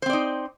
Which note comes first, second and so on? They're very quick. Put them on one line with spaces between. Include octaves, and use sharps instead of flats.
C5 C4 D5 D#4